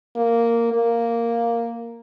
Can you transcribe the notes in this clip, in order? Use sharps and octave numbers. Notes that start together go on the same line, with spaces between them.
A#3
A#3